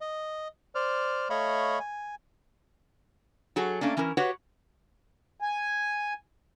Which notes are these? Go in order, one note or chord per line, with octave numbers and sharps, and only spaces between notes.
D#5
C5 D5 F6
A3 C#5 D#5 F5 B5 C#6
G#5
F#3 F#4 G#4 A4
A3 A#3 C#4 D4
E3 C#4 E4 A#4
F#4 G4 B4 C#5 F#5
G#5